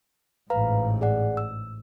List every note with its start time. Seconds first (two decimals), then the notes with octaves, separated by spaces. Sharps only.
0.50 A1 G#2 B4 F5 A#5
1.01 G#4 D5 F#5
1.37 E6